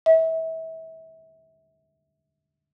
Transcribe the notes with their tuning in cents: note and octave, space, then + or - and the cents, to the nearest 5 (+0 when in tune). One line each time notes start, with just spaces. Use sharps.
E5 -30